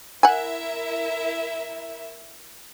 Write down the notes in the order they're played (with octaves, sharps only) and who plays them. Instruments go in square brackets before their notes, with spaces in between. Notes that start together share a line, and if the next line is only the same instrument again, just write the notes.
[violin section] E4 A#4 E5 [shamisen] F#5 G#5